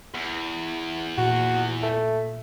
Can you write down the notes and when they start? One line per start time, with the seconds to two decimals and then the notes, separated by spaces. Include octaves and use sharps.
0.14 E2
1.18 A#2 F#4
1.82 A3